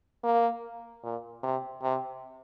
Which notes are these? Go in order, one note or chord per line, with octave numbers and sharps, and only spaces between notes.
A#3
A#2
C3
C3